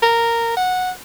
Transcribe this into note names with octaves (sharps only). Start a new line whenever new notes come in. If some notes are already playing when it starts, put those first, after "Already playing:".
A#4
F#5